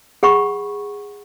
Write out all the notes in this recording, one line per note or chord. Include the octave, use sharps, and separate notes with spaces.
G#4 F#5 B5 C#6